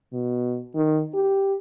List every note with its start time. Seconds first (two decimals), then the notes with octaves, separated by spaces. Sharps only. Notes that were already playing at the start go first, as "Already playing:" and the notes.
0.13 B2
0.75 D#3
1.14 G4